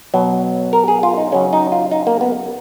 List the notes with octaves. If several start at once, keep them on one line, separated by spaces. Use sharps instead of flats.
B2 F#3
A#4
G#4
F4
D#4
C#3 F#3 C#4
D#4
F4
D#4
A#3
B3